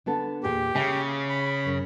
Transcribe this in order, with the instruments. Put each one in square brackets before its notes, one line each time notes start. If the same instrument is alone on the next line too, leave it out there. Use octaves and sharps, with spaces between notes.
[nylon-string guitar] D3 B3 A4
[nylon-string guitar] E2 A#2 G#4 [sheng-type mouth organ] G4
[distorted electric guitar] C#3 [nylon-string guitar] E5 G#5
[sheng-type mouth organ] B5
[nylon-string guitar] F#2